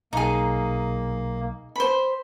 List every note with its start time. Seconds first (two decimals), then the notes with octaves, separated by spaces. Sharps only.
0.13 B1 A#3 D#4 G#4
1.76 C5 B5